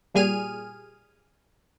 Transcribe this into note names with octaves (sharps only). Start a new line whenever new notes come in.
A#2 G3 G#4 G#5 F6 D#7